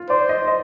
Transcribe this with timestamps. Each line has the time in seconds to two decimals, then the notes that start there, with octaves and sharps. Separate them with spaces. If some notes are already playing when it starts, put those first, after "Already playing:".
Already playing: F4
0.10 C5 D5
0.29 D#5
0.48 D#5